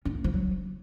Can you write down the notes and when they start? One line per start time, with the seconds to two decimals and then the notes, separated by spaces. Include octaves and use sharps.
0.05 C#4
0.15 A#3
0.24 F3
0.34 F#3